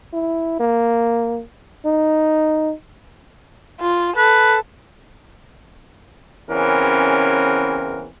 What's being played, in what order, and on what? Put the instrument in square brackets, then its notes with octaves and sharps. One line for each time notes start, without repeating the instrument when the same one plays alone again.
[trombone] E4
A#3
D#4
[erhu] F4
[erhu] A4 [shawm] B4
[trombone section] E2 C#3 E3 C4 C#4 A#4